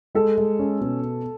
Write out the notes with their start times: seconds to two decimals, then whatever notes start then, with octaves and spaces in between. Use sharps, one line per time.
0.15 G#3 A4
0.38 G#3
0.59 C#4
0.81 B2